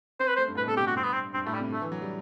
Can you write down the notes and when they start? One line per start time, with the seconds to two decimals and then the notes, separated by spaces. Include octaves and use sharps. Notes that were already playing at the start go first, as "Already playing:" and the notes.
0.20 C4 C5
0.28 B4
0.36 A3 C5
0.48 G2
0.55 A2 B4
0.63 B2
0.68 C3 A4
0.77 D3 G4
0.87 F#4
0.95 G2 C4
1.03 B3
1.13 C4
1.34 G2 C4
1.46 A2 A3
1.54 G3
1.60 C3
1.72 D3 A3
1.82 E3
1.92 F#3
2.02 G3